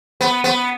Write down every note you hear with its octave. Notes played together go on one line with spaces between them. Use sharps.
B3
B3